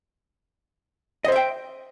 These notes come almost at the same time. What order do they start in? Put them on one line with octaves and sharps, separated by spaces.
D#5 C5 E5 G5